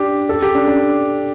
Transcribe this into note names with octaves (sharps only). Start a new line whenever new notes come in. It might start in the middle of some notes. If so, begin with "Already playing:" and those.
Already playing: D4 G4
A4
G4
D4
D4